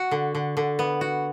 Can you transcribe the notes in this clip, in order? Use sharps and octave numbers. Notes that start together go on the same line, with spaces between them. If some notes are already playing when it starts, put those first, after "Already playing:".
Already playing: F#4
D3
D3
D3
B3
F#4